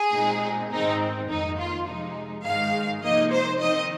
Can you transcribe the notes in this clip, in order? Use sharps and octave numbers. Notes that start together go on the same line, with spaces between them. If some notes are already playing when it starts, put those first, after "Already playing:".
Already playing: G#4
A#2 G#3 C4 D#4
G#2 D#3 G#3 C4 D#4
F2 D#3 A#3 D#4
F4
C3 F3 G#3 D#4
G#2 D#3 G#3 D#4 F5
C3 F3 A#3 D#4 D#5
C5
D#3 C4 D#4 D#5